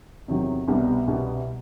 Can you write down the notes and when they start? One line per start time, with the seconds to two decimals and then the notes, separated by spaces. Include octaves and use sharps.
0.28 E2 C3 D#3 F#3
0.68 C2 B2 G3 B3
1.07 C2 B2 G3 B3